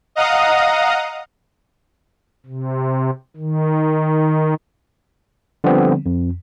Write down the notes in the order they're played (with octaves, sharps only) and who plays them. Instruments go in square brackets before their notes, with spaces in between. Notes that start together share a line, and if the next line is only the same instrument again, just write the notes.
[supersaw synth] D#5 F5 F#5 A#5 D#6
[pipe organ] C3
D#3
[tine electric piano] D3 F3 G3 B3 C4
F2